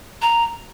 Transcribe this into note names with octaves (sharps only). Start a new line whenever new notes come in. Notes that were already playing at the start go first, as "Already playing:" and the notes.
A#5